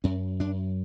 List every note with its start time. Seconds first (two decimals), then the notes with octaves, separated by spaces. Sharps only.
0.04 F#2 C#4
0.40 F#2 D4